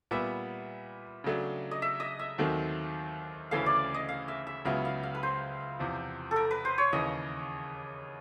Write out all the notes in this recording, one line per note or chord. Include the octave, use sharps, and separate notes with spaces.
A#2 G3 B3 E5
C#3 F#3 A3 D4
D#5
E5
D#5
E5
D#2 D#3 F#3 A3 C4
D2 C#3 E3 A3 C#4 F5
D5
D#5
F5
E5
E5
C#2 C#3 F#3 B3 E4 F5
F5
F5
B4
C5
E2 C3 F3
A4
A#4
B4
C5
C#5
D#2 C#3 E3 D#5